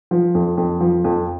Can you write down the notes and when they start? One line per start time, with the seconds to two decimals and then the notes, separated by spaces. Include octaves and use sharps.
0.11 F3
0.35 F2
0.58 F2
0.80 F3
1.04 F2